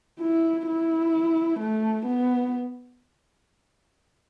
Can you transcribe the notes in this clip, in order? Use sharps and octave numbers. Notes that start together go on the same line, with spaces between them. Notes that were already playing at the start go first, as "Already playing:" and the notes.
E4
E4
A3
B3